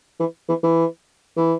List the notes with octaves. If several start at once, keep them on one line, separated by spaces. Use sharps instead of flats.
E3
E3
E3
E3